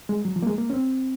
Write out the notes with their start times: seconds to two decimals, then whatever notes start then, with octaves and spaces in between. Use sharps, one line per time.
0.09 G#3
0.25 F#3
0.36 F3
0.43 A#3
0.47 G#3
0.58 A#3
0.70 C#4
0.73 C4